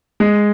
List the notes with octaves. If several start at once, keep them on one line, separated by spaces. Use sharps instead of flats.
G#3